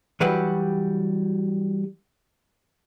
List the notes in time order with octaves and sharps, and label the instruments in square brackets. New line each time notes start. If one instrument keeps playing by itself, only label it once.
[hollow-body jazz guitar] E3 F#3 G3 F#4 G4 B4